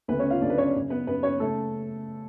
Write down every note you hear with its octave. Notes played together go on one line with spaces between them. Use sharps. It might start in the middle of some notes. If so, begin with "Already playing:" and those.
D2 C#3 B3 B4
C#4 C#5
F4 F5
D2 C#3 D4 D5
B4
C#4 C#5
F#2 C#3
B3 B4
F#2 C#3 B3 B4
C#4 C#5
C#3 A3 A4